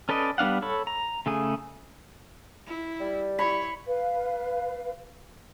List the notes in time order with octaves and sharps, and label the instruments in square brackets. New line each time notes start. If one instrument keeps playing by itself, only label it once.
[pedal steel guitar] C#4 A4 B4 D5 D#5
G3 B3 D4 F5 F#5
A4 C#5 B5
A#5
C#3 A3 G#4
[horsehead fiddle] E4
[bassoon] G3
[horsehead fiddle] E4 C#5 [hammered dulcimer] B5
[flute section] B4 F5